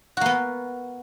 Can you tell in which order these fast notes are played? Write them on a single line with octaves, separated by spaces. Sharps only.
F#4 A#3 B3